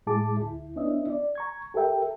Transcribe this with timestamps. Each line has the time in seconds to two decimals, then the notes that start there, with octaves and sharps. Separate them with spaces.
0.07 A2 G#3 E4 G#4 A5 D6
0.37 D2 E4
0.76 B3 C#4 D4 E4 D#5 E5
1.10 D5
1.35 A#5 C#6 G#6
1.74 G4 A4 A#4 E5 G5